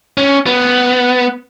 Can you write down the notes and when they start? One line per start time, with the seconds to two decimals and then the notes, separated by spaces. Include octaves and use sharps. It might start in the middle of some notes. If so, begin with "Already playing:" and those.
0.17 C#4
0.46 B3